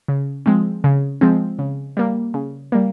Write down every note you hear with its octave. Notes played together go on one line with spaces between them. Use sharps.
C#3
F3 G#3 C4
C#3
F3 G#3 C4
C#3
G3 A#3
C#3
G3 A#3